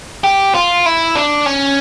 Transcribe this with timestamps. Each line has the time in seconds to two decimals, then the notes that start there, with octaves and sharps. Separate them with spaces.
0.24 G4
0.55 F4
0.86 E4
1.16 D4
1.46 C#4